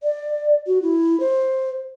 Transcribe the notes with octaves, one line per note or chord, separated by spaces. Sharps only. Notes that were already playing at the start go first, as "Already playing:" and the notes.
D5
F#4
E4
C5